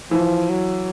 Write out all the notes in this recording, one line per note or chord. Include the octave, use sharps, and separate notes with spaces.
E3 F3
F#3